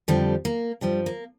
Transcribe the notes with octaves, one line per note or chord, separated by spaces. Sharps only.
F2 D3 F3 G3
A#3
G2 F3 G3
A#3